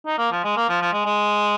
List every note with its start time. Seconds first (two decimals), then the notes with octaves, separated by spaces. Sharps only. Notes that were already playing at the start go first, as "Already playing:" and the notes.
0.06 D#4
0.18 A#3
0.32 F3
0.44 G#3
0.57 A#3
0.69 F3
0.81 F3
0.93 G#3
1.05 G#3